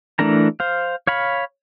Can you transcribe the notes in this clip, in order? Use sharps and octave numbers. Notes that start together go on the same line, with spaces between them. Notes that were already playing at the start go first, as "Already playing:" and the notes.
E3 A3 D4 A#4 A#5
C5 F5
C#5 F5 B5